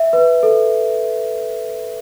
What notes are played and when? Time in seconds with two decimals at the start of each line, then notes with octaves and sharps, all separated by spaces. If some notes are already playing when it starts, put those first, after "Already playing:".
Already playing: E5
0.13 B4
0.43 A4